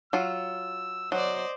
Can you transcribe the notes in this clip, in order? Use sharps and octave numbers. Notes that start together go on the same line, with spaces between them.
F#3 F4 E6
F#3 C5 D5 D#5